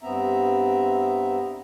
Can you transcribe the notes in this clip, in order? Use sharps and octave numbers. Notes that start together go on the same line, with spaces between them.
G2 B3 C4 E5 A#5